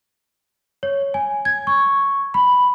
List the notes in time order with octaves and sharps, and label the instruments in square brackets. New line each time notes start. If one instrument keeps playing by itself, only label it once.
[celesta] C#5
G#5
G#6
C#6
B5